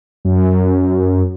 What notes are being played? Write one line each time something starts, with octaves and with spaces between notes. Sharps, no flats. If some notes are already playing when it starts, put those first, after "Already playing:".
F#2